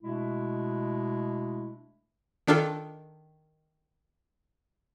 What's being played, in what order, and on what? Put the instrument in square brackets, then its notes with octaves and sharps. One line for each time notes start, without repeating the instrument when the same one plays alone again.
[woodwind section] B2 G#3 A3 D4 E4
[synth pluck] D#3 D4 F4 A4